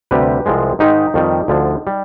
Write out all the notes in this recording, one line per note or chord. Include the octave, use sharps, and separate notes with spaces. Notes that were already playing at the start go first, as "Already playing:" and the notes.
D2 C3 G3 G4 B4
C2 C3 F3 G#3
G#2 D#3 G#3 D#4 G4
F2 D#3 G3
D2 D3 F3
G3